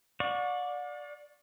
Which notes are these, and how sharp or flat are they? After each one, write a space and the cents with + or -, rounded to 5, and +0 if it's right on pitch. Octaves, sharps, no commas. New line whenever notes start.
D5 +0 F#5 -45 C#6 +5